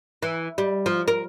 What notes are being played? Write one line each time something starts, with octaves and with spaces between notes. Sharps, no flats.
E3
G3
F3
A#4